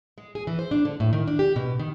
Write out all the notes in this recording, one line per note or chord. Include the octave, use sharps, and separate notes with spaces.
G#3
G#4
E3
C5
D4
D3
A2
D#3
D4
G4
B2
D#3